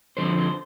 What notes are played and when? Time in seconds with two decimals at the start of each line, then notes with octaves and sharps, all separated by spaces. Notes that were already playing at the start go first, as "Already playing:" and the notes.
0.17 F2 D3 F3 C5
0.37 C5